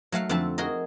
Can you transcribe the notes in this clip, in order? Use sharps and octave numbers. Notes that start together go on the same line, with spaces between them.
F#3 A3 F5 F#5
F2 D3 C4 E5 A5
F#4 G#4 A#4 D#5